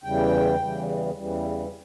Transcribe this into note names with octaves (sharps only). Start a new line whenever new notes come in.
E2 C#3 E3 G3 G5
E2 C#3 E3 G3
E2 C#3 E3 G3